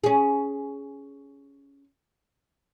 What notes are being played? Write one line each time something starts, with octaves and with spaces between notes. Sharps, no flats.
C#4 G#4